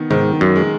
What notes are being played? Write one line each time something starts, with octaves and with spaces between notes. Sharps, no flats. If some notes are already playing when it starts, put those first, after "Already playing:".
Already playing: D#3 B3
G#2 D#3
F#2
G#3